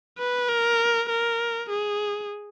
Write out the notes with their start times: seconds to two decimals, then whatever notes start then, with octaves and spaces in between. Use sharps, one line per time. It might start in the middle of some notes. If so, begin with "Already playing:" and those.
0.18 B4
0.49 A#4
1.10 A#4
1.70 G#4